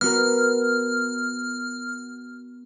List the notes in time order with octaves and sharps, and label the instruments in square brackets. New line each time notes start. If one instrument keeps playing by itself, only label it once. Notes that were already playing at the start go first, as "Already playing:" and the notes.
[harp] B3 F#4 A#4 [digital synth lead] F6